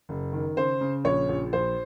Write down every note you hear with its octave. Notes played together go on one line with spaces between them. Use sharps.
F#1
D#3
C#3 C5
C#3
A#1 C#5
A#1
A#1 C5